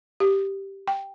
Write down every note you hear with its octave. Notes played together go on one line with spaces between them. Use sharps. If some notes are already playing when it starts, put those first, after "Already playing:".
G4
G5